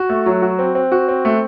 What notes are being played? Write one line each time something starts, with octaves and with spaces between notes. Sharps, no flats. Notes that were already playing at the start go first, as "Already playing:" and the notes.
Already playing: F#4
A3
F#3
F#4
C4
C4
F#4
C4
A3